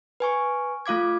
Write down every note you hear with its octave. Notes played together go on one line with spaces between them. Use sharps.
B4 G#5 C#6
A3 F4 F5 D6 G#6